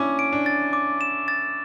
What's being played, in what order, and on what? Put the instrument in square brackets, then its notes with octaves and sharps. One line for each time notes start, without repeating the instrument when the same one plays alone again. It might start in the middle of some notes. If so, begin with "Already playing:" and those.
Already playing: [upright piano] C#4 D4 E4 [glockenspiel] D6
[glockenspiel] D7
[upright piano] D4
[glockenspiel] A6
D6
E7
A6